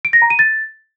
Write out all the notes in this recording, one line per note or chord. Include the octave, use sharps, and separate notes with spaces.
D7
A#6
A#5
D#7
A6